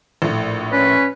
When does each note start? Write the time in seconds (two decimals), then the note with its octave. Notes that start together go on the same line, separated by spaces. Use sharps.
0.22 A#1 A2
0.72 C#4 B4